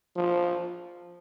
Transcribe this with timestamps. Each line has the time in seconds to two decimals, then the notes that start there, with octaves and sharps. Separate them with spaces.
0.16 F3